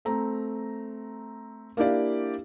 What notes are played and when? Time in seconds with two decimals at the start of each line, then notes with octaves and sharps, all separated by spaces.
0.05 A3 C4 A#5
1.77 A#3 D4 E4 G4 D5 F5